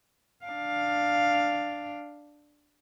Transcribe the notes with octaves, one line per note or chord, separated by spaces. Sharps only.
D4 F5